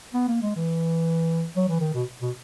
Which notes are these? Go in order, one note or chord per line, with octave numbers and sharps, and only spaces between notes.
B3
A#3
G#3
E3
F#3
E3
D#3
B2
B2